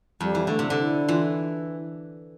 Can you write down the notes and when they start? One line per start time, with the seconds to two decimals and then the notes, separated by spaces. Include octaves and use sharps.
0.20 F2 G3
0.35 E3
0.47 D3 A3
0.59 C3
0.70 D3
0.79 E4
1.08 E3 F4